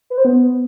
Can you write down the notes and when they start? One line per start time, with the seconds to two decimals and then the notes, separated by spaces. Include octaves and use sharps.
0.10 B4
0.18 C5
0.25 B3